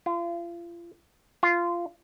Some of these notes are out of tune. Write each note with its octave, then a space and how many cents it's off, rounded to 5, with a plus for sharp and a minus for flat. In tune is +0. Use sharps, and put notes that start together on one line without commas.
F4 -35
F4 -15